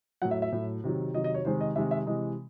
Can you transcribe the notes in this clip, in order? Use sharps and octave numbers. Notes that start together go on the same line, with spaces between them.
A2 F#3 F#5
E5
E5
A2 F#3
C3 D#3 F#3
C3 D#3 F#3 D#5
D#5
C#5
C3 D#3 G#3 C5
D#5
C3 D#3 G#3 E5
E5
C3 E3 G#3 D#5